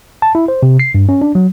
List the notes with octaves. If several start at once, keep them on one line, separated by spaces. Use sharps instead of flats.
A5
E4
C5
C3
C7
G2
C#4
D4
F#3